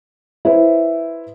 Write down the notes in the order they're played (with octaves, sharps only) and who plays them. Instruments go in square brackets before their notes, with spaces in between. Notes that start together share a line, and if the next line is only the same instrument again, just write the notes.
[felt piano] E4 B4 C5